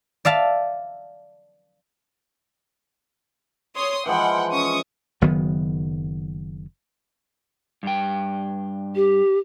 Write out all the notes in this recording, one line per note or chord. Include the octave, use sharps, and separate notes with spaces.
D5 E5 F5 A5
C#5 C6 D#6
E3 F3 G#3 F#5 G5
C#4 C#6 D#6
F#1 D#3 F#3 B3
G2 G5
G4